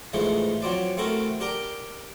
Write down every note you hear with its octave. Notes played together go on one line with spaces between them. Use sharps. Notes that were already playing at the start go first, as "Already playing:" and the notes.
G#2 E3 F3 A3 C5
F3 F#3 C4 D5
A3 C4 E4 F#4 A4 A#4
D4 G4 A#4 G5